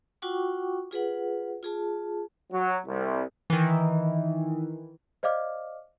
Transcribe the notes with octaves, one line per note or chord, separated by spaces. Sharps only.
F4 F#4 F#5 G5 C#6 D6
F4 G#4 B4 F#5
F4 G#4 A5
F#3
C2
D#3 E3
C5 D5 D#5 F5 D6 F6